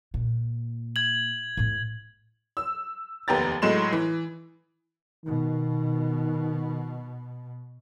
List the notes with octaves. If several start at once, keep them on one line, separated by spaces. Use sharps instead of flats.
A#2
G#6 F#7
A2 A3
E6
F1 D#2 B3 G4 A#5 A6
A2 F#3 G#3 C6 E7
E3
B2 D#3